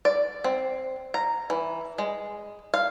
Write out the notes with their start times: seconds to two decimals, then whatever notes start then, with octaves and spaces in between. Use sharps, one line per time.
0.05 D5
0.44 C4
1.14 A#5
1.50 E3
1.98 G#3
2.74 F5